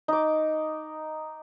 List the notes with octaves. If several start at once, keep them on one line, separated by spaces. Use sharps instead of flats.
D#4 D6